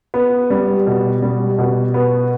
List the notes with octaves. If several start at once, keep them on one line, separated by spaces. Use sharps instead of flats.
B3
G3
B2
G3
B2
B3